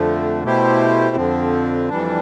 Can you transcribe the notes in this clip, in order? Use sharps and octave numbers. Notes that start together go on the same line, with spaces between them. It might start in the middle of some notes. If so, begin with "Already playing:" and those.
Already playing: F2 D3 F3 A3
B2 A3 E4 G4 C5
F2 D3 F3 C4
F2 E3 G3 D4